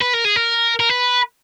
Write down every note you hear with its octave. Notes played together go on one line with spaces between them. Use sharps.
B4
A#4
G#4
A#4
A#4
B4